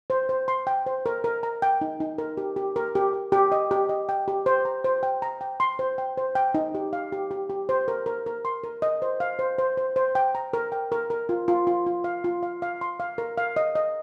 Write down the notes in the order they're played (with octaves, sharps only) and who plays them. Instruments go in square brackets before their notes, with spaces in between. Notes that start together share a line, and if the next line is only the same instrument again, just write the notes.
[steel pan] C5
C5
C6
G5
C5
A#4
A#4
A#5
G5
D#4
D#4
A#4
G4
G4
A#4
G4
G4
G4
D#5
G4
D#5
G5
G4
C5
A#5
C5
G5
A#5
G5
C6
C5
G5
C5
G5
D#4
G4
F5
G4
G4
G4
C5
A#4
A#4
A#4
C6
A#4
D#5
C5
F5
C5
C5
C5
C5
G5
A#5
A#4
G5
A#4
A#4
F4
F4
F4
F4
F5
F4
F5
F5
C6
F5
A#4
F5
D#5
D#5